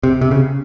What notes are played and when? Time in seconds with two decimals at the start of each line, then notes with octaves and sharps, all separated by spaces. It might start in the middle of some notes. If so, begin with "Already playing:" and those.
0.03 C3
0.21 C3
0.31 C#3